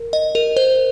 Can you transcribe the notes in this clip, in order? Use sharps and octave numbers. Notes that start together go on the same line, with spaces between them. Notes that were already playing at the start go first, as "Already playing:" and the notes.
Already playing: A#4
D#5
A#4
C5